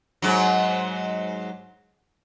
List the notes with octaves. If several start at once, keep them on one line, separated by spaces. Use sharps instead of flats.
G#2 F#3